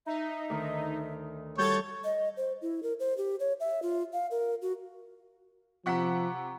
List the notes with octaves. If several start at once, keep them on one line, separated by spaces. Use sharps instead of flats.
D#4 E5
D2 D#3
G3 F#4 A4 C#5 G6 A6
D#5
C5
E4
A#4
C5
G4
C#5
E5
F4
F5
A#4
F#4
C3 F3 F#5 A#5 C#6 B6